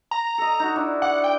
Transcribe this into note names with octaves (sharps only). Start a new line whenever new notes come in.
A#5
A4 D#5
D#4 F#4
D4 E4
D5 F#5
G5